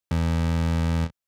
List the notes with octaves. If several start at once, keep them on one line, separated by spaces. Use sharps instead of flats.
E2